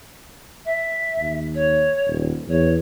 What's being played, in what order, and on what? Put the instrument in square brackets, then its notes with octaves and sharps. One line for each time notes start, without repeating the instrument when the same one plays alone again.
[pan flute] E5
[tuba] D#2
[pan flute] C#5
[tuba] D#1
[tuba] E2 [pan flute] C#5